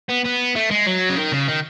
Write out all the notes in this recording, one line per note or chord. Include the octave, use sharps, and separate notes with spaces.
B3
B3
A3
G#3
F#3
C#3
D#3
C#3
D#3